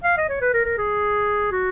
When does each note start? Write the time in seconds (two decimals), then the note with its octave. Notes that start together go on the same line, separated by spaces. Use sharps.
0.04 F5
0.17 D#5
0.29 C#5
0.41 B4
0.53 A#4
0.66 A#4
0.78 G#4
1.51 F#4